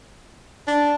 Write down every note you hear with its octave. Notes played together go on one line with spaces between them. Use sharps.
D4